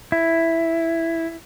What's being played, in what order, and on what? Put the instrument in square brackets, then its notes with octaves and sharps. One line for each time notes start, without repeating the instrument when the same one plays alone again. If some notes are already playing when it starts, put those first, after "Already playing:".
[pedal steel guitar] E4